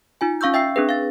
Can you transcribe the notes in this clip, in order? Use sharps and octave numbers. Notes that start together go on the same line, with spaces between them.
D#4 F4 G#5
C#4 F5 C#6 E6 G6
E5 G5 E6 C7
C4 D4 G#4 B4
F5 A6